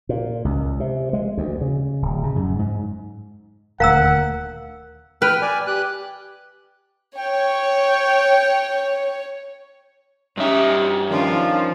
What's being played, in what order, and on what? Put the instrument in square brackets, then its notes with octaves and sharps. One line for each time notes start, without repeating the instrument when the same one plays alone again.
[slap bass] A#2
C#2
C3
G#3
D2
C#3
D1
C#3
F#2
G#2
[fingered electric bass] D#1 D2 [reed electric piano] A#4 [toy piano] F5 A#5 E6 [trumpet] F#5
[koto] B4 [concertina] G5 F6
[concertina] D5 G#5
G4 F#6
[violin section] C#5 [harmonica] G5
[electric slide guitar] G2 E5 [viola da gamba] C#4 D#4 G4
[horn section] D#3 F3 [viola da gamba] C#4 D4 F4